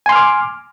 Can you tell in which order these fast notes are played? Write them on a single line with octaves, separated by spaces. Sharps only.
G#5 C6 F6 D6